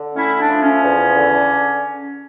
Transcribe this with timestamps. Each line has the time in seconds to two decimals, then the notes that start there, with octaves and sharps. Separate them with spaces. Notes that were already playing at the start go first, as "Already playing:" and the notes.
Already playing: D3
0.16 A3 C#4 E4
0.39 D4
0.49 F3
0.60 C#4
0.83 E2
1.16 D3